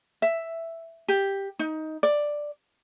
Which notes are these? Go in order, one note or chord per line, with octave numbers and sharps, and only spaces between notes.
E5
G4
D#4
D5